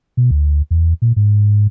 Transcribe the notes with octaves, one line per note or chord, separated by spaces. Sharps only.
B2
D2
E2
A#2
G#2